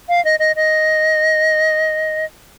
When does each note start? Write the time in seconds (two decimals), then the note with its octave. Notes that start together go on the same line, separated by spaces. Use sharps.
0.09 F5
0.25 D#5
0.39 D#5
0.56 D#5